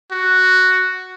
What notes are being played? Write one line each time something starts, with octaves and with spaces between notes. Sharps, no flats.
F#4